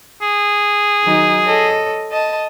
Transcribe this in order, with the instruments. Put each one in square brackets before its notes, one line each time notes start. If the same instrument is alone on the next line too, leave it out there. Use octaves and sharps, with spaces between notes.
[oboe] G#4
[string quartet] D#3 F#3 D#4
A4 C#5 D#5
D#5 A5